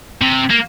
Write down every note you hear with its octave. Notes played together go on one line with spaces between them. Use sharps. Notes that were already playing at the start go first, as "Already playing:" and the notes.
C3
A#3